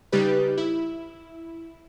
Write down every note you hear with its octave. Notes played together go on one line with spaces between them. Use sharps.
C#3 G3 D#4 G4 B4
E4